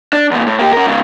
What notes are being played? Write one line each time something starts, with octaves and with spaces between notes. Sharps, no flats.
D4
E2 A#2
A2
A#3 G4
C#4 A#4
G#2 C#3